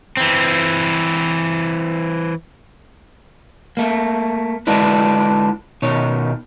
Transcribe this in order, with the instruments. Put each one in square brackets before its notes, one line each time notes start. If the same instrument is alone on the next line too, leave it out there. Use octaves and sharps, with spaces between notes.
[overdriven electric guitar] E3 C4
[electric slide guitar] A3 A#3
D3 G#3 D4 E4 B4
B2 D#3 C#5